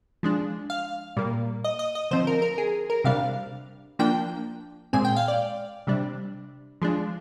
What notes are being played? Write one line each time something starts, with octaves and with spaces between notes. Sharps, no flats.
F3 G#3 D4
F5
A#2 G3 A#3
D#5
D#5
D#5
D3 F3 C4 C5
A#4
A#4
G#4
A#4
C3 G3 D4 F5
F3 A#3 D4 G5
A#2 G#3 C4 G#5
G5
F5
D5
C3 G3 D4
F3 G#3 D4